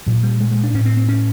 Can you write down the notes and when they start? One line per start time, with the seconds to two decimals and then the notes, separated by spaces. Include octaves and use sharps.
0.06 A#2 F#3
0.23 G3
0.41 G#3
0.52 G#3
0.64 D4
0.74 A2 C#4
0.86 C4
0.97 C4
1.09 C#4